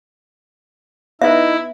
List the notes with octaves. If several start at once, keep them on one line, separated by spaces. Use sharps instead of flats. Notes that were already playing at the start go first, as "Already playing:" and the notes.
B3 D#4 E4 B4 E5